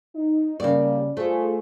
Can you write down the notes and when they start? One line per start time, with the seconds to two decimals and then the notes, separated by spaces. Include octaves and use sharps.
0.14 D#4
0.60 C#3 G3 A#3 D5
1.17 A3 F4 G#4 C5